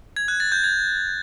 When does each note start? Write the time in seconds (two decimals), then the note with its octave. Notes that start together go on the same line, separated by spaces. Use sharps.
0.16 G#6
0.28 F#6
0.40 A6
0.52 G6
0.64 G#6